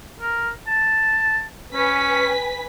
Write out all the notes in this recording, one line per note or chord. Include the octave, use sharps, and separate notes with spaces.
A#4
A5
C#4 B4 G#5 B6